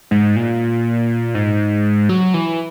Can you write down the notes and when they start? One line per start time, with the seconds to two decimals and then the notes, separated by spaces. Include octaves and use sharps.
0.11 G#2
0.36 A#2
1.35 G#2
2.09 F#3
2.34 E3